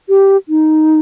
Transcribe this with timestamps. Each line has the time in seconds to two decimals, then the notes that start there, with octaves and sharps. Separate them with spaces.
0.09 G4
0.49 D#4